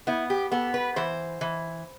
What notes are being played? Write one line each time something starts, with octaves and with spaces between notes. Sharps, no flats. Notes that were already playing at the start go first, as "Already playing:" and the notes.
B3 E4
G4
B3 A4
B4
E3 C5
E3